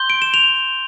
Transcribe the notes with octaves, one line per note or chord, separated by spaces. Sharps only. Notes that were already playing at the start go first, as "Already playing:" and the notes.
Already playing: C6 G6 G7
D7
E7
F7